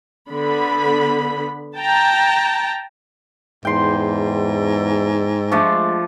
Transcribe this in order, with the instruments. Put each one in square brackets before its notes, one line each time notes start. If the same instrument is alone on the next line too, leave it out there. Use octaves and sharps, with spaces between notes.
[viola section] D3 B3 B5
G5 A5 A#5
[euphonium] E2 [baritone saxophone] G#2 [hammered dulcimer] G5 C6
[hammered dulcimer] F3 A3 D4 [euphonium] G#3